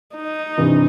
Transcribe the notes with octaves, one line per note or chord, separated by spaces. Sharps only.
D#4
G2 C3 E3